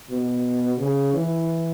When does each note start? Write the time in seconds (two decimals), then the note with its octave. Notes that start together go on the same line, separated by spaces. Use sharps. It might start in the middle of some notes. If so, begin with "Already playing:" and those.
0.10 B2
0.78 C#3
1.13 E3